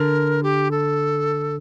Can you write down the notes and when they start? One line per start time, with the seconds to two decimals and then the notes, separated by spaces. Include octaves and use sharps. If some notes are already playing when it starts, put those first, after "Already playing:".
Already playing: D3 A#4
0.43 G4
0.71 A4